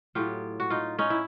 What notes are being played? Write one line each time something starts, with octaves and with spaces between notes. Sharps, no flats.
A2 F#3 F4 G4
F#4
D#4 F4
C#4 D#4
E4